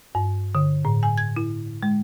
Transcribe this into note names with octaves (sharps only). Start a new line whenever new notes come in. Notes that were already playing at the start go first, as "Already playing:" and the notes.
G2
D3
A2
G#5
G#6
E4
G#3